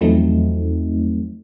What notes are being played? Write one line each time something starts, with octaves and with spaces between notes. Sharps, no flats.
E2 F3 F#3 A3 C4 D#4